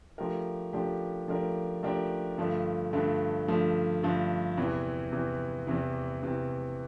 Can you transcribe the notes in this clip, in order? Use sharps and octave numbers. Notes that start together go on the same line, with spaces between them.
F3 A3 D4 G4 A#4
F3 A3 D4 G4 A#4
F3 A3 D4 G4 A#4
F3 A3 D4 G4 A#4
G2 D3 F3 A3
G2 D3 F3 A3
G2 D3 F3 A3
G2 D3 F3 A3
E2 C3 E3
E2 C3 E3
E2 C3 E3
E2 C3 E3